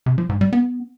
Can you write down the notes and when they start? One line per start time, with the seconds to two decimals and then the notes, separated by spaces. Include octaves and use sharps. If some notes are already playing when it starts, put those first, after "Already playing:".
0.06 C3
0.18 F3
0.29 G#2
0.41 G3
0.53 B3